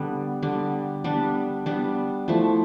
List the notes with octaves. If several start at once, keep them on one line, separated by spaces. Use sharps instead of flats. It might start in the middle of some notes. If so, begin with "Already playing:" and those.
Already playing: D3 G3 B3
D3 G3 B3
G3 B3 D4
G3 B3 D4
F3 A3 E4